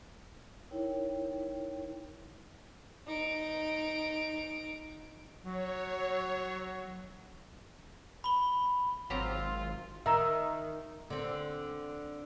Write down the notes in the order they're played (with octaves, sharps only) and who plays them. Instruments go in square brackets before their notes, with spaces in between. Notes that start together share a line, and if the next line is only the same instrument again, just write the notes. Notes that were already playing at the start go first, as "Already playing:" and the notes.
[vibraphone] D#4 E4 A#4 C#5 G5
[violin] D#4 D7
[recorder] F#3 [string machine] C#5
[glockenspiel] B5 G7
[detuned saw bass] G#1 [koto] F#3 G4 A#5 [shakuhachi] C4 [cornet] F4
[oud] D#3 [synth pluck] E5 A#5 E6
[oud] D3 C4